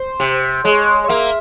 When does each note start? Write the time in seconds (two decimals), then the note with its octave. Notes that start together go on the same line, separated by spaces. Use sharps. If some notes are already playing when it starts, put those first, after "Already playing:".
Already playing: C5
0.20 C3
0.64 G#3 C#5
1.04 C#5
1.08 A#3 E5